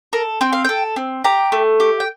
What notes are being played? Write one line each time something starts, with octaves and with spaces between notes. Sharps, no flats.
A4 A#4
C4 G5
F5
A4 G5
C4
G4 A#5
A3
G4
G5